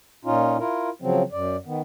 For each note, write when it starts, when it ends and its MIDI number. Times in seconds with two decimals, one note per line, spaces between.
0.25 0.58 46
0.25 0.58 61
0.25 0.58 63
0.25 0.58 65
0.59 0.90 64
0.59 0.90 65
0.59 0.90 70
1.02 1.23 49
1.02 1.23 53
1.02 1.23 54
1.02 1.23 60
1.32 1.57 42
1.32 1.57 74
1.66 1.81 51
1.66 1.81 59